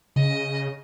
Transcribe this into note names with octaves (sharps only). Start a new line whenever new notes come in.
C#3 D#5